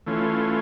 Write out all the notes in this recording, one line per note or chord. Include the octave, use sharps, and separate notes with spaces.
E3 A3 C#4 F4